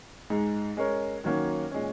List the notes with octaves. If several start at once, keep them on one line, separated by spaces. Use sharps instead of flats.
G#2 G#3 D#4
G#3 C#4 A#4 C#5
D#3 F#3 A#3 C#4 F#4
A#2 G#3 C#4